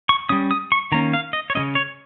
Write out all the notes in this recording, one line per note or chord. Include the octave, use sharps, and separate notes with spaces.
C#6
G3 C#4 D#6
D#6
C#6
D#3 A#3 C#4 A#5
F5
D#5
C#5
C#3 G3 C#4 D#5
C#5